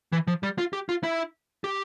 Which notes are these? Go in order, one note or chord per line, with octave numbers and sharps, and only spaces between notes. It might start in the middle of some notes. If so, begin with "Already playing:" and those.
E3
F3
G3
F4
G4
F4
E4
G4